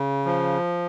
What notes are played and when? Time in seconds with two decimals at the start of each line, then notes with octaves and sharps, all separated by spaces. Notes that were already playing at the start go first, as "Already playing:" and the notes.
Already playing: C#3
0.25 F3